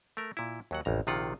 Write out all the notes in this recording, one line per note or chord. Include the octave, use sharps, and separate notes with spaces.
A3 A#4
A#2 E4
D#2 F#3 F#5
A1 F2 A#5
A#1 C3 D#3 F4 F#5